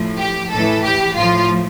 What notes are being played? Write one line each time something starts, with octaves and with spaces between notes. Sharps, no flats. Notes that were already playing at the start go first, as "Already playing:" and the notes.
Already playing: A2 F3
G4
A2 E3 A4
G4
A2 F3 F4